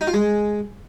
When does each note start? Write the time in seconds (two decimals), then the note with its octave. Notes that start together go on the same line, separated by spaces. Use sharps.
0.01 D#4
0.07 F4
0.14 G#3